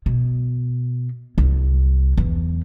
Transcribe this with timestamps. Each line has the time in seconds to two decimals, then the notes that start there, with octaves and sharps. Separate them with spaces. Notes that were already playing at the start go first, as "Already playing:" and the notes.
0.06 B2
1.38 C2
2.18 E2